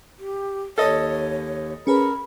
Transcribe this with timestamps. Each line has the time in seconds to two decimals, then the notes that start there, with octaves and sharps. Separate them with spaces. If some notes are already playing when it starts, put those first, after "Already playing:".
0.19 G4
0.78 D#2 A4 C#5 D#5
1.87 C#4 G#4 A#4 B4 B5